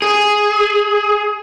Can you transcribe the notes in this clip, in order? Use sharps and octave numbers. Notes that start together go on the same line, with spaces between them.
G#4